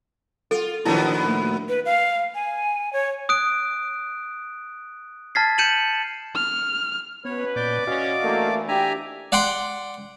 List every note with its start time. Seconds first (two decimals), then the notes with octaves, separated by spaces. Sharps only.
0.51 F4 A4
0.85 A2 D#3 F3 F#3 B3 D4 E4 A5
1.24 A3 A#3
1.69 B4
1.85 F5
2.35 G#5
2.93 C#5
3.29 D#6 F#6 D7
5.35 A5 F6 G#6 A6 B6 C7
5.58 G6 C#7 D#7 E7 F#7
6.35 F6
7.25 B2 B3 C#4 B4 C#5
7.56 A#2 D5 D6 G6
7.87 C#4 F#4 D#5 F5
8.23 D2 E3 A3 A#3
8.68 D4 G4 E5 G#5 A#5
9.32 D5 F#5 G5 C6